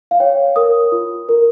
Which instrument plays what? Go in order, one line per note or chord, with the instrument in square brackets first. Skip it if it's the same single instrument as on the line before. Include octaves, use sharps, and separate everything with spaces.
[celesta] F5
C#5 G5
A#4 D#6
F4
A#4